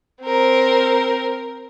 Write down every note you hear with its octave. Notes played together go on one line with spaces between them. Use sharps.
C4 A#4